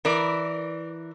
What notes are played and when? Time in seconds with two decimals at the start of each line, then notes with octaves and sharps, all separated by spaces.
0.05 E3 A#4 D5